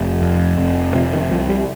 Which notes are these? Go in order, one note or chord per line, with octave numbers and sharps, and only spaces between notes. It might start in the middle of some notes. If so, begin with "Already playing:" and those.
Already playing: F1
F2
F1
C3 F3
D#3
C2 F3
G3